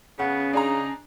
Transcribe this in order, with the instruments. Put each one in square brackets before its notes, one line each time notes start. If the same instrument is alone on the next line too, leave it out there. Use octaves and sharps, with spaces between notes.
[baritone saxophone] C#3 [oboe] B3 [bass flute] C#4 [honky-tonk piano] F#5
[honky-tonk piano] D4 G#4 A#5 [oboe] D#4